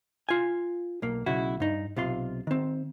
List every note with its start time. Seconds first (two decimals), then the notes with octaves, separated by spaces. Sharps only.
0.29 F4 G#5
1.02 B1 A#3
1.26 B1 C#3 E4 F#4
1.60 G2 D#4
1.96 B1 C3 F4 C6
2.47 D#3 C4